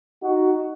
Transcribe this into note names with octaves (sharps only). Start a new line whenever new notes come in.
D#4 F#4